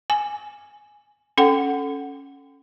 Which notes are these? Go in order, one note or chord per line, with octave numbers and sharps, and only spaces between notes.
G#5
C#4 A4 F#5 G5